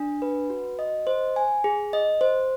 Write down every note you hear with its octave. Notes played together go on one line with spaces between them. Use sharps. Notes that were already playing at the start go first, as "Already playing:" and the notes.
Already playing: D4
B4
F#4
D#5
C5
G#5
G#4
D#5
C5